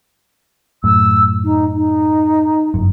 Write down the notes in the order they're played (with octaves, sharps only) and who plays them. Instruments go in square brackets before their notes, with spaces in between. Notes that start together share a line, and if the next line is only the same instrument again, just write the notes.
[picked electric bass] F#2 A2 [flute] E6
[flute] D#4
D#4
[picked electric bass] G1 F#2